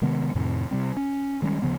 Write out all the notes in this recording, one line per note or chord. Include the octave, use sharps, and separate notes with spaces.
C3 D#3 G#3 B3
F2 A2 C3 D#3
C3 G3 C4
C#4
D#3 G3 G#3 C#4
D2 C#3 F3 B3